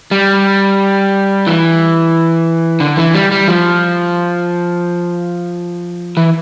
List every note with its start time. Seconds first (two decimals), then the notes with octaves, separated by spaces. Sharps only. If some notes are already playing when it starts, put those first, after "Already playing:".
0.11 G3
1.47 E3
2.80 D3
2.97 E3
3.14 G3
3.32 G3
3.48 F3
6.17 E3